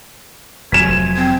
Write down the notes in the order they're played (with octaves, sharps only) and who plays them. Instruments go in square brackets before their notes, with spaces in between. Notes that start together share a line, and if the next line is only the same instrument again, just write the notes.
[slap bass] F1 F3 F#3 [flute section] G#5 G#6 [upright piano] B6 E7
[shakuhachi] C4